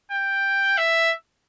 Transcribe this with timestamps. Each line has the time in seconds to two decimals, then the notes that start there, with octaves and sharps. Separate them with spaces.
0.11 G5
0.77 E5